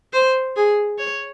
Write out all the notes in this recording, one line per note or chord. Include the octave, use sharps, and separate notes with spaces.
C5
G#4
C#5